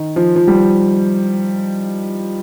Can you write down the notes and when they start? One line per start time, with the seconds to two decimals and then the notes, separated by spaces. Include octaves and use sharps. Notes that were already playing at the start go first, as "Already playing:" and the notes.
Already playing: D#3
0.16 F3
0.36 F3
0.47 G3